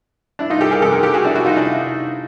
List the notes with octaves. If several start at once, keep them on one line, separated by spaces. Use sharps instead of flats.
D4 E4
D#4 F4
G4 A4
G#4 A#4
F2 C3 E3 G4 A4
G#4 A#4
G4 A4
F#4 G#4
D4 E4
E4 F#4
D#4 F4
D4 E4